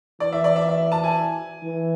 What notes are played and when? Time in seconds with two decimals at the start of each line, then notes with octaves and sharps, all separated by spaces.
0.20 E3 D5
0.32 E5
0.44 D5
0.56 E5
0.68 E5
0.92 A5
1.04 G#5
1.63 E3